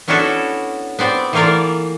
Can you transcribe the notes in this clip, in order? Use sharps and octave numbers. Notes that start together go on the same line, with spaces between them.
B3 C#4 D4 E4 F#4 A4
B3 C4 D5
E3 A3 A#3 F4 A#4 D5